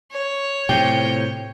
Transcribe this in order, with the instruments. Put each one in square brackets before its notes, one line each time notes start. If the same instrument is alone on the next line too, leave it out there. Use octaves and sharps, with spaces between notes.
[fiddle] C#5
[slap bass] A2 C3 [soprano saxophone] G5